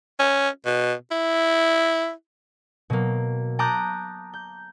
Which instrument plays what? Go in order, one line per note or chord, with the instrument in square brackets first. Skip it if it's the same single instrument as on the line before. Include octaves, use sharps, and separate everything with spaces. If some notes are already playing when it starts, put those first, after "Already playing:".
[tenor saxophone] C#4
B2
E4
[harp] B2 F#3 A#3
A5 A#5 D6 D#6 F#6 G6
G6